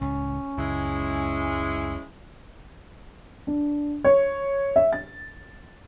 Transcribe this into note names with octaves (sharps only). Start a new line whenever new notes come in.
C#2 A2 C#4
C#2 F#2 G#3 E4
D4
C#5
E5
A6